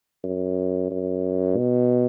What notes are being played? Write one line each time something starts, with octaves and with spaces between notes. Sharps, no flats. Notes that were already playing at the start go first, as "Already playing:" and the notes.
F#2
F#2
B2